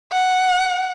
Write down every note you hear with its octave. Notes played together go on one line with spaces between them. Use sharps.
F#5